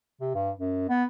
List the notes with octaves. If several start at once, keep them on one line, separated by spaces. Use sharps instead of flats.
C3
G2
F#2
B3